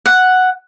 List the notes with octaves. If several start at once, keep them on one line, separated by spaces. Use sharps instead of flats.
F#5